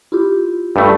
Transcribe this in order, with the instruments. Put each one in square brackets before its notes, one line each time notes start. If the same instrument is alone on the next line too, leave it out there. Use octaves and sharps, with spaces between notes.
[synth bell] E4 F4 G4
[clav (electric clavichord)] G2 A3